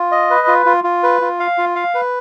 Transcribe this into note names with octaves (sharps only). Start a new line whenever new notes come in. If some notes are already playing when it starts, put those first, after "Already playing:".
Already playing: F4
D#5
B4
F4
F4
F4
B4
F4
F5
F4
F5
B4